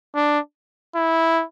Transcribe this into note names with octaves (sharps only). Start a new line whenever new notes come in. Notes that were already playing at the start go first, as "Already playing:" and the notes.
D4
E4